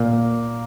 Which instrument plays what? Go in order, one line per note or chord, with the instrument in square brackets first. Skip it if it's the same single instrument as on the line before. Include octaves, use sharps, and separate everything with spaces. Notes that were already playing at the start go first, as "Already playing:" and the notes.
Already playing: [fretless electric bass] A#2 [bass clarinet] A#3